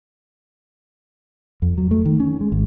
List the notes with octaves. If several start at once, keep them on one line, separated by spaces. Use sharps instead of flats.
F2
F#3
A3
D#3
C#4
G#3
G#1